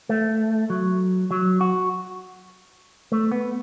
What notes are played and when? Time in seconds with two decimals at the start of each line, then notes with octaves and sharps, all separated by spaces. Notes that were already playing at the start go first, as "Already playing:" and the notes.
0.09 A3
0.70 F#3
1.31 F#3
1.61 F#4
3.12 A3
3.32 B3